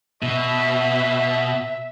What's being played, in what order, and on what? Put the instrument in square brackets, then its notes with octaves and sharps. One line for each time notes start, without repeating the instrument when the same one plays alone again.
[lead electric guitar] B2 [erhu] E5